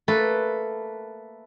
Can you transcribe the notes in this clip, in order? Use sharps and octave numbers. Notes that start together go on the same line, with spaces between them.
A3 A#3 A4 B4